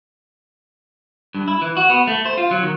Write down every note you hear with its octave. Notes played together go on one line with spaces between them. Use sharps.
G2
E4
E3
F#4
B3
A3
C5
F4
F#3
D#3